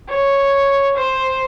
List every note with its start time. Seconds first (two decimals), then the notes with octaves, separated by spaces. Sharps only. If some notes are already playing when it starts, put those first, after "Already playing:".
0.09 C#5
0.96 C5